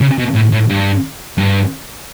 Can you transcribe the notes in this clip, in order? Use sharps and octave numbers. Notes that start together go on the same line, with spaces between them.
C#3
B2
A2
A2
G2
G2